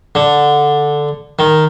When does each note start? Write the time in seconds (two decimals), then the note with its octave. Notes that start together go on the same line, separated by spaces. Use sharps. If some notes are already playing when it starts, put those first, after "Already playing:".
0.15 D3
1.39 D#3